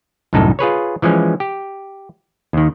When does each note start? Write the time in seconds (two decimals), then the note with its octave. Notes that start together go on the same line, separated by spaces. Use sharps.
0.33 C2 F#2 A2 D#4 A4
0.59 F4 G#4 B4 C#5
1.02 E3 F3 G#3 C#4
1.40 G4
2.53 D#2 D#3